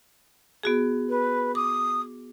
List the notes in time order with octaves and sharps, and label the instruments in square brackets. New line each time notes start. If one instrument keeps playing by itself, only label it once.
[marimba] B3 F#4 G#4
[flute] B4
[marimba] D6 [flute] D#6